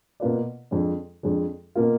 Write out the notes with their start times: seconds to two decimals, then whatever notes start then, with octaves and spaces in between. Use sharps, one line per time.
0.20 B2 A#3 F4 B4 D5
0.71 F2 D3 G#3 D4
1.23 F2 D3 G#3 D4
1.75 B2 A#3 F4 A#4